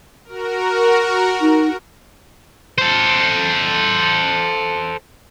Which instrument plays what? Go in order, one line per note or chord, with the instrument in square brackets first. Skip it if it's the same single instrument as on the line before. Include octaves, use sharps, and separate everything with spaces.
[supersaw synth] F#4 A#4
[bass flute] D#4
[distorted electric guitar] A4 C5